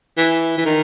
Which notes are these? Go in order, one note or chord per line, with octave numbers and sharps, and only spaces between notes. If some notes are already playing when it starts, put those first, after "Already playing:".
E3
E3
D#3